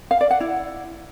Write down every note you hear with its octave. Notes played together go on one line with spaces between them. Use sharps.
F5
D5
F#5
E4